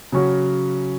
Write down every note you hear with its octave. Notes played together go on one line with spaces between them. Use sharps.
C#3 F#3 C#4 F#4